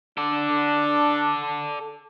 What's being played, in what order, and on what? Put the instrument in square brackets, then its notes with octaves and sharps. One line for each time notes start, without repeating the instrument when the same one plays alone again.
[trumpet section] D4 [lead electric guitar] A4 D5